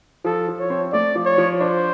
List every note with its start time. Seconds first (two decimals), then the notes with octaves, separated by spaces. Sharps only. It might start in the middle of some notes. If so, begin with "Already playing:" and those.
0.24 F3 A4
0.48 F3
0.59 C#5
0.70 C4
0.93 A3 D5
1.15 F3
1.26 C#5
1.38 F3
1.60 D4 C5